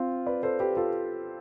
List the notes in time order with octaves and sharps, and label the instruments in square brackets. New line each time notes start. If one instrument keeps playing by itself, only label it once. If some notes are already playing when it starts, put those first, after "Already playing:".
Already playing: [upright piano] C4 F4
[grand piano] B4 D5
A4 C5
G4 B4
F4 A4